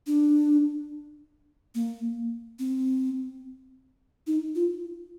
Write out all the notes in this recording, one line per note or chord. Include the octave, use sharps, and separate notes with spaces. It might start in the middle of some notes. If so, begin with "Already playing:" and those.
D4
A#3
C4
D#4
F4